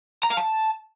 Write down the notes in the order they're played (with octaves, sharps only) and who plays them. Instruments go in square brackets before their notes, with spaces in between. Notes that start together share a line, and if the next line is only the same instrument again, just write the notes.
[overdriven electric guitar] A#5
F5
A5